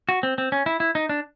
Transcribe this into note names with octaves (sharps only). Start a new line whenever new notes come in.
F#4
C4
C4
C#4
E4
E4
D#4
D4